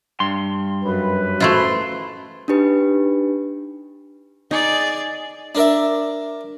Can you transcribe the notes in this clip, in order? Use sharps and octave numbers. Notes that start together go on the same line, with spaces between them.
G2 C6
F#2 B4
F#2 A3 E4 F4 C5 C6
D4 D#4 G4 B4
D#4 G#4 D5
D4 A#4 E5